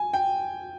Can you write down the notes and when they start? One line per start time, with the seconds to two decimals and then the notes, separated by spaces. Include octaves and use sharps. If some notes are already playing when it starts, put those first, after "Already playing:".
Already playing: G#5
0.13 G5